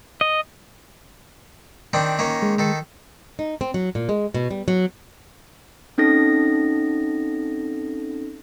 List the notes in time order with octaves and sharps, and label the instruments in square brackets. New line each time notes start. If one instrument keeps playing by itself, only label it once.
[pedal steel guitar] D#5
[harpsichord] D#3 C4 D4
D#3 A#3 C#4
[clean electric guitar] G#3
[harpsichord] D#3 A4
[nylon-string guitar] D#4
C4
F#3
A#2
G#3
B2
G3
F#3
[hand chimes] C4 C#4 D#4 A4 A#6